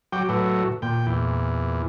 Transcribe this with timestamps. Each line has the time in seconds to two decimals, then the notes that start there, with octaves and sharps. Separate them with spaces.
0.12 F#3 G5 D6
0.29 A2 F#3 B4
0.82 A#2 G5
1.06 E2